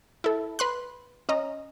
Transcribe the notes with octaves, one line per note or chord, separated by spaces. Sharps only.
E4 A4
B4 C6 F#6
C#4 D#5 A#5